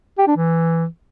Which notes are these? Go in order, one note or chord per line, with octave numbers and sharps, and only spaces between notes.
G4
D4
E3